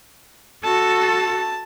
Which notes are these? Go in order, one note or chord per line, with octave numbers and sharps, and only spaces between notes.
F#4 A4 A5